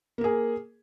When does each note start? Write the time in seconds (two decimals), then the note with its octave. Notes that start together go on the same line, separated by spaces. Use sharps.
0.18 A#3
0.21 A#4
0.24 G#4